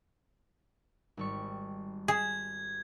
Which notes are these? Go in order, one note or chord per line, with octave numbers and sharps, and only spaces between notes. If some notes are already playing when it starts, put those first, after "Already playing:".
G#1 G3 C#6
G#4 G#6 B6 E7